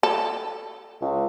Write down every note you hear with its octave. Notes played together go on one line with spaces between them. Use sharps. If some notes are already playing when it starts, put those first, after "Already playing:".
A4
C#2